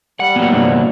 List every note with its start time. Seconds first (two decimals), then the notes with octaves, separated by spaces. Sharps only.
0.20 G3 F#5
0.36 A#2 F#3 B3 F#5
0.52 C2 G2